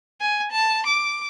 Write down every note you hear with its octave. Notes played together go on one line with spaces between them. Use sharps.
G#5
A5
D6